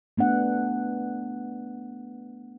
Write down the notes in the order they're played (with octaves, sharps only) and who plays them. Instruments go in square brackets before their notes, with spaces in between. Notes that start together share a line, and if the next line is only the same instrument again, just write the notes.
[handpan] A3 B3 D4 F#5